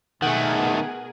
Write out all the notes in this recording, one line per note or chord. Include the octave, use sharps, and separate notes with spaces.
B2 D#3 A3 G#4 A#4 F#5